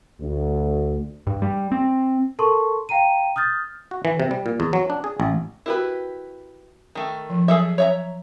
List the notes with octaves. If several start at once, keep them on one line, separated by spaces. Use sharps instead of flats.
D2
G2
G3
C4
A4 A#4 A5 C6 C#6
F5 G5 A#5 D#7
D#6 F6 G6 A6
F#4
E3
C3
G3
A#2
E2
F#3
D4
G#4
A1
E4 F#4 G4 A#4 B4
D#3 A3
F3
F#3 G#4 A4 E5
C#5 E5 A#5